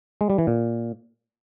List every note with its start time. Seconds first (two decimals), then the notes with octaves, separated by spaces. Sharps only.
0.21 G#3
0.30 G3
0.38 E3
0.47 A#2